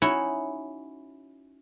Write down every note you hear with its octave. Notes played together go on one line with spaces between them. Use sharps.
C#4 D#4 E4 F#4 C#5